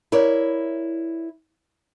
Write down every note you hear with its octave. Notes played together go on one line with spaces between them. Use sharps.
E4 A#4 C#5 D5